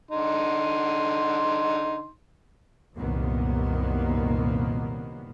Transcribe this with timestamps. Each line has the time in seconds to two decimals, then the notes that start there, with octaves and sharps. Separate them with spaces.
0.11 D3 D#4 C6
2.96 C2 F#2 A#2 D#3 A#3 B3